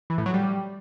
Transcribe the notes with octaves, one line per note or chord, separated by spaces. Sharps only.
E3
A2
F#3
G3